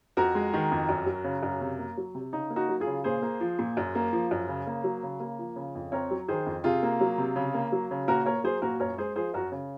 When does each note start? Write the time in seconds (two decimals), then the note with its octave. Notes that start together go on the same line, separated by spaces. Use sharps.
0.17 F2 F#4 A#4
0.35 G#3
0.53 D#3
0.72 F2
0.89 F#2
1.06 F#3
1.24 C#3
1.43 F#2
1.61 C3
1.79 A#3
1.97 F#3
2.15 C3
2.33 C#3 D#4
2.50 A#3
2.56 D#4 F#4
2.69 F#3
2.80 F4 G#4
2.87 C#3
3.04 A#2 G#4 C5
3.22 A#3
3.41 F3
3.59 A#2
3.77 F#2
3.95 A#3
4.13 F3
4.31 F#2
4.48 C#3
4.67 A#3
4.84 F#3
5.03 C#3
5.20 A#3
5.39 F3
5.56 C#3
5.75 F2
5.92 C4 A#4 C#5
6.11 F#3
6.28 D#3 G#4 C5
6.46 F2
6.64 C3 F4 G#4
6.83 A#3
7.01 F#3
7.18 C3
7.36 C#3
7.54 A#3
7.72 F#3
7.91 C#3
8.08 A#2 F#4 A#4
8.26 A#3 A#4 C#5
8.44 F#3 G#4 C5
8.62 A#2 F#4 A#4
8.80 F#2 A#4 C#5
8.98 G#3 G#4 C5
9.16 F3 G#4 C5
9.34 F#2 F#4 A#4
9.52 C#3